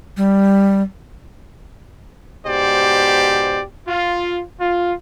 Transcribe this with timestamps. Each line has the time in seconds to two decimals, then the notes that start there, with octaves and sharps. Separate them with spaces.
0.17 G3
2.46 G#2 B2 G4 C5 D5
3.88 F4
4.60 F4